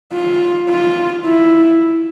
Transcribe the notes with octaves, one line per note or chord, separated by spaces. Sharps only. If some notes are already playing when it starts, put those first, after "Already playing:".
F4
F4
E4